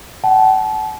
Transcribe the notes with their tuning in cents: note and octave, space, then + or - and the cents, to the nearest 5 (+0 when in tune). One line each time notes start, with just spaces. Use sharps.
F#5 +40 A5 -35